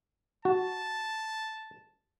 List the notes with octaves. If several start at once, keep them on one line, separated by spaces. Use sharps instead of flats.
F#4 A5